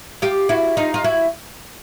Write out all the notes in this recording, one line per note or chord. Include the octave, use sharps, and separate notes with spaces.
F4 G4
E4 F#4
D#4 F4
F4
E4 F#4